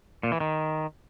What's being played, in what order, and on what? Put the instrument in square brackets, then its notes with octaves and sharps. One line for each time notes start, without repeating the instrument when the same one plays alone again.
[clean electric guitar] A#2
E3
D#3